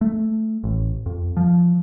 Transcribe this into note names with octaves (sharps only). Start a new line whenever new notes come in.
A3
A1
F2
F3